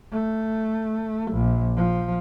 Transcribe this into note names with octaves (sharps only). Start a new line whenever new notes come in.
A3
A#1
F3